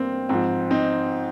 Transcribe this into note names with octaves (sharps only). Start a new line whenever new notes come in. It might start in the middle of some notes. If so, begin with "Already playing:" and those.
Already playing: G2 A#3 C4
G#2 F3 C4
C4 D#4